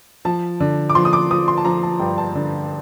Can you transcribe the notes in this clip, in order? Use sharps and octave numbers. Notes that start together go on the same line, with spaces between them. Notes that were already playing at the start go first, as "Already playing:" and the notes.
F3 A5
D3
D6
F3 C6
D#6
D6
F3 D#6
C6
A5
F3 A#5
A5
G2 G5
A5
D3